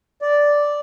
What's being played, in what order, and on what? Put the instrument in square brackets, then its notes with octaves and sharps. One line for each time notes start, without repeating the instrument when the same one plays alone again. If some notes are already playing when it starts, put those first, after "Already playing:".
[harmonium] D5